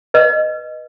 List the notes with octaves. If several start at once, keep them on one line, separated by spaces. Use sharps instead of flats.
B4 D#5